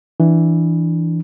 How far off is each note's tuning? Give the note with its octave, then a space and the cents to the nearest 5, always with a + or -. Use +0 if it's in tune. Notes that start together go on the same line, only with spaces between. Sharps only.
E3 +0 D4 +10